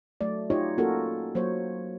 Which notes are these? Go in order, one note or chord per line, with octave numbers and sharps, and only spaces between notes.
F#3 A3 D5
D#4 F4 G4 C#5 D#5
A#3 C#4 F4 F#4 A4 A#4
F#3 A#3 C5 C#5